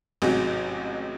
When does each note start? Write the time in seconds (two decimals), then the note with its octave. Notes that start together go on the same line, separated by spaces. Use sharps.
0.22 A1 G#2 C3 F#3